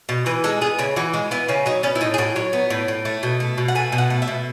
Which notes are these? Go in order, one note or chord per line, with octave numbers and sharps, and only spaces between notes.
B2
E3 B4
G#3 A4
B3 G#4
C#3 E4
E3 F#4
G#3 F#4
B3 E4
C#3 C#4
F#3 D#4
B3 C#4
E4
A2 D#4
G#4
A2 F#4
F#3 C#5
B3
A2
A2
A3
B2
A3
B2
F#5
A3 G#5
B2
F#5
A3
E5
B2